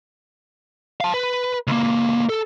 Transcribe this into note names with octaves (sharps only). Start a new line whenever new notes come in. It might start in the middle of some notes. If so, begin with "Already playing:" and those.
F5 A5
B4
C#2 A#3
A4